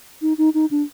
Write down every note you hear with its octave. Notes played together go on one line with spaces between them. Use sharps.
D#4
D#4
D#4
D4